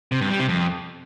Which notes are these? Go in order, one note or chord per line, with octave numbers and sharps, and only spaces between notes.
C3
G2
G3
C3
F2